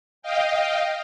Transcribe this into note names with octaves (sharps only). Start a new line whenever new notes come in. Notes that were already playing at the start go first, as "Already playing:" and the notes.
D#5 F5 G5